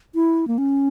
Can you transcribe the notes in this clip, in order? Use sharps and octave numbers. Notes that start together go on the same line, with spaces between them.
E4
A#3
C#4